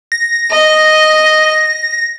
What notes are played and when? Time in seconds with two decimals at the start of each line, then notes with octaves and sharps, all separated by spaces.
0.12 A#6
0.52 D#5